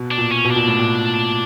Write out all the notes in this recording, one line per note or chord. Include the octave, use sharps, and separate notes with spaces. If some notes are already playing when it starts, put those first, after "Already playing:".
Already playing: B2
D4
A#2
C#4
B2
D4
A#2
A2
A#2